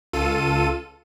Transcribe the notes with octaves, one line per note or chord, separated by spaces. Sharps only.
C#2 F4 A4 D#7